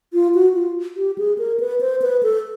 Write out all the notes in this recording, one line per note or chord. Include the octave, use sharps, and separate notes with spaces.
F4
F#4
F4
G4
G#4
A#4
B4
C5
B4
A4